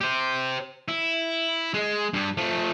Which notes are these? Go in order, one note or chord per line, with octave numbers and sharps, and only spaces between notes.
G4 C5
E4
G#3
G2 G3
F3 A3